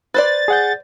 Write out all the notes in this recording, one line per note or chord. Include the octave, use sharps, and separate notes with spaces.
B4 C5 D5 A6
G#4 F#5 G6